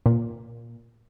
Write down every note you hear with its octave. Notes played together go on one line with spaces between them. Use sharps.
A#2